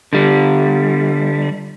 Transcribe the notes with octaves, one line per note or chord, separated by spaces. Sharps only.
D3 G3